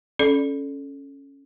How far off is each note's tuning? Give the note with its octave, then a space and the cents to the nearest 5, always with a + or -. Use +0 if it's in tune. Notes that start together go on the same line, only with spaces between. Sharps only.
C#4 +0 A4 -15 D5 +5